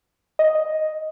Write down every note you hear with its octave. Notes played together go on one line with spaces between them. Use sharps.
D#5